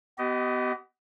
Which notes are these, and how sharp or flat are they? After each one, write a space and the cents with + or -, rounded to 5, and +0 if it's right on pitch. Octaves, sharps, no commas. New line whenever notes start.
B3 +20 G4 -35 D#5 +0